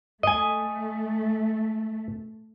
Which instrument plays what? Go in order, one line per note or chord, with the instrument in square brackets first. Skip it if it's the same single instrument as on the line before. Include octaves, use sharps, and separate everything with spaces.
[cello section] A3 [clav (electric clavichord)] D#5 G#5